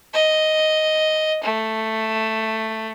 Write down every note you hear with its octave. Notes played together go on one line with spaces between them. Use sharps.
D#5
A3